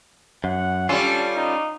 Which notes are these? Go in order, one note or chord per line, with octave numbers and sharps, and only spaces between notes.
F#2 F#5
G3 C#4 D4 F4 A4
D#4